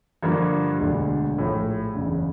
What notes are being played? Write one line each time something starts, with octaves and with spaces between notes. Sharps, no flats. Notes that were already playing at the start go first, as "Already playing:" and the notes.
G2 D3 F3 A#3
E1 D2 D3
A#1 A2 F3 A3
F#1 E2 C#3